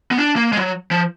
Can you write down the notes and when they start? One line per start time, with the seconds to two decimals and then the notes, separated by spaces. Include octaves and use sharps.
0.11 B3
0.17 D4
0.36 A#3
0.53 G#3
0.57 F#3
0.91 F3